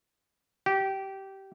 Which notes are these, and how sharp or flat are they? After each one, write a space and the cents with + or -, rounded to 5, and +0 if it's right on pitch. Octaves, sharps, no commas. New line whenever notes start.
G4 -20